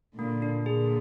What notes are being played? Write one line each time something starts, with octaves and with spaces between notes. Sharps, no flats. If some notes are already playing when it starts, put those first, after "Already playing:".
A#2 D3 A#3
D4
A#2 D3 G#4